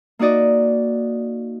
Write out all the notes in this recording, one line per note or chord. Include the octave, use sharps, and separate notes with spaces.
A#3 D#4 F#4 D5 D#5